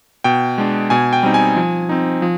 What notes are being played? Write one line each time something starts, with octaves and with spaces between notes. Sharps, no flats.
B2 G5
G#3 D4
B2 G#5
G5
G3 C4 D#4
G#5
F3
C4 D#4
F3